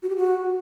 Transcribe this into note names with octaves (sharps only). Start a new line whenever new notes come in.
F#4
G4
F#4